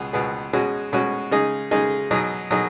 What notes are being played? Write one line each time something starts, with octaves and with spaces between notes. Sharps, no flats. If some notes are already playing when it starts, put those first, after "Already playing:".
Already playing: C#2 B2 B3 G#4
C#2 B2 B3 G#4
B2 G#3 C#4 F#4
B2 G#3 C#4 F#4
C#3 G#3 D#4 G#4
C#3 G#3 D#4 G#4
B2 F#3 D#4 G#4
B2 F#3 D#4 G#4